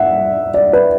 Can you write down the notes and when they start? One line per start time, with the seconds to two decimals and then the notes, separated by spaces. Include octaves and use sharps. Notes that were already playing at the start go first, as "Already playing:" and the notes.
Already playing: E5 F#5
0.54 D5
0.73 B4